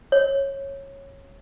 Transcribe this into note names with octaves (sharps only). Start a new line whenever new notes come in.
C#5